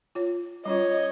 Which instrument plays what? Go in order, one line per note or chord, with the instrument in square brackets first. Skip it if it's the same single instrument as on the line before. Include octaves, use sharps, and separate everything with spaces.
[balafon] F4 C#5
[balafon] G3 C#4 F4 [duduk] C#5 [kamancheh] D#5